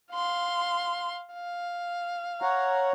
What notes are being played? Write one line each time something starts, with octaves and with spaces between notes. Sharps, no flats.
F5 C6
F5
C#5 F#5 A#5